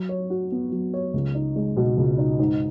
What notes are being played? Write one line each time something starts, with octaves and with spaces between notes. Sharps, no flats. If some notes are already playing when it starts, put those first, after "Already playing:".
Already playing: F#3
C#5
F#4
B3
F#3
C#5
C#2
D#4
G#3
B2
C#2
D#4
G#2